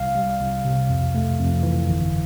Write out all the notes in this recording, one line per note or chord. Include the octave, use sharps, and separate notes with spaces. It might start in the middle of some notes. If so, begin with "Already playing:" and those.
Already playing: C2 F5
G3
C2
C3
F2
A3
F2
E3
G1